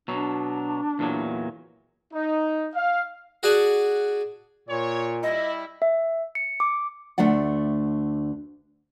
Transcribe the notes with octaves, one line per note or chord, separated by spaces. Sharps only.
B2 F#3 D4
E2 A#2 F#3
D#4
F5
F#4 G#4 D5 F#5 G#5 A5
A#2 C#5
G3 E4 D#5
E5
C#7
D6
D2 A3 D4 D5 F#5